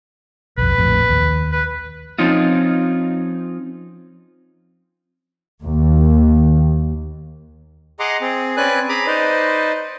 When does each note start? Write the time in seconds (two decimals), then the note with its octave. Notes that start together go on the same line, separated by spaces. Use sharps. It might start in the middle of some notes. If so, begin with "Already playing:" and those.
0.58 B1 F2 B4
0.78 A#1 F2 A2
1.09 D#2
1.52 B4
2.18 F3 C4 C#4 D#4 F4
5.65 D#2
8.00 G#4 D#5 F#5 A#5 C6 D6
8.21 C4 G#4
8.57 C4 C#4 B4 D5 G#5 F#6
8.89 G#4 A#5 B5 D6
9.07 D#4 B4 C5 D5 D#5